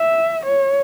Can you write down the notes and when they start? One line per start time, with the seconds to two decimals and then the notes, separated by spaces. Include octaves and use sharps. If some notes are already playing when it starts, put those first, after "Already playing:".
Already playing: E5
0.46 C#5